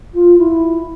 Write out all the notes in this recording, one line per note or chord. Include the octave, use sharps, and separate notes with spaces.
F4
E4